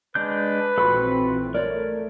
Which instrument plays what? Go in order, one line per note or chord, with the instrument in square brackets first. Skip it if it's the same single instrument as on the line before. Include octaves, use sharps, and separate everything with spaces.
[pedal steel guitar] G#3 D4 G6 [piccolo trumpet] B4
[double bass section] A#1 E3 C4 [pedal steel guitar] F4 F#4 A4 [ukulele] B5
[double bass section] A3 [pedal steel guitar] A#4 [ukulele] C#5 D5